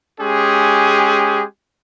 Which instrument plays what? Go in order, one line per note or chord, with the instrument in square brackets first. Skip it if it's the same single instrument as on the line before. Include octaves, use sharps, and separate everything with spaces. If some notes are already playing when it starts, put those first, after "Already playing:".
[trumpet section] G#3 C#4 G4 G#4